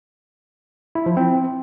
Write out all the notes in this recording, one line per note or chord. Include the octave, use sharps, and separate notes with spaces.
E4
F3
C4